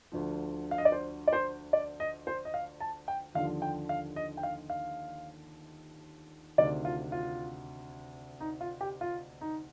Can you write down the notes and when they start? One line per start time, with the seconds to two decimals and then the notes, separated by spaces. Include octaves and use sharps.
0.12 D2 D3 F3
0.71 F5
0.78 D#5
0.85 D5
0.92 C5
1.28 D5
1.33 C5
1.73 D5
2.00 D#5
2.27 C5
2.45 D#5
2.54 F5
2.80 A5
3.08 G5
3.35 D#2 D3 F3 F5
3.62 G5
3.89 F5
4.16 D#5
4.37 G5
4.43 F5
4.70 F5
6.58 D2 C3 D#3 D5
6.85 F4
7.12 F4
8.40 D#4
8.61 F4
8.81 G4
9.01 F4
9.41 D#4